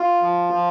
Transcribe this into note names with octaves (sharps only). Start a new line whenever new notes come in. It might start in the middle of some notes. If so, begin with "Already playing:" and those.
Already playing: F4
F3
F3